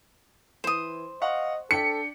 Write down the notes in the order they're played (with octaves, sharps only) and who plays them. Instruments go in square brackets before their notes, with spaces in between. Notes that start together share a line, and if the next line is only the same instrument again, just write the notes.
[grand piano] E3 [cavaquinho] C5 D#6
[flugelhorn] D#5 [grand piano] F5 F#5 C#6
[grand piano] D4 G5 B6 [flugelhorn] A4 [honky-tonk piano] C#7